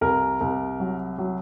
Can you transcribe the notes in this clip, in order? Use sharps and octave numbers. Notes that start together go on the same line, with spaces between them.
C2 A#4
C2
F#3
F#3